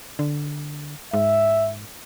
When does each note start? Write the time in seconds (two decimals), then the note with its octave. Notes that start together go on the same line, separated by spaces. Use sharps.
0.19 D3
1.14 G#2 E5